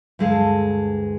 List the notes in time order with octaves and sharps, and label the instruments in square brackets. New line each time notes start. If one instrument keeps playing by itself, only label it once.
[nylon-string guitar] D2 G2 G#3 A4 F5